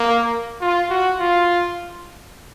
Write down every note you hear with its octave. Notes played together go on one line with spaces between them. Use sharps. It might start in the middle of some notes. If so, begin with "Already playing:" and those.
Already playing: A#3
F4
F#4
F4